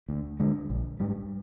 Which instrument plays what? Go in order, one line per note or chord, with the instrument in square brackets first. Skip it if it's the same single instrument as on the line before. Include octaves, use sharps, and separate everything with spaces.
[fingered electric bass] D2
D3 G#3
A#1
G#2 G3